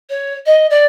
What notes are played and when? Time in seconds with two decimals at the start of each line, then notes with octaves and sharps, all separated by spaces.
0.10 C#5
0.46 D#5
0.70 D5